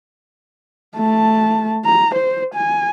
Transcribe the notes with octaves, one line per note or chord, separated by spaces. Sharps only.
A3 A5
A#5
C5
G#5